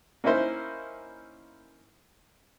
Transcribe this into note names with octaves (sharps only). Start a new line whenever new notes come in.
A#3 C#4 D#4 E4 C5